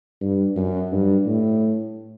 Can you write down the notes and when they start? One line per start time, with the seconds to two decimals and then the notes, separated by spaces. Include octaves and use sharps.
0.21 G2
0.56 F#2
0.92 G2
1.26 A2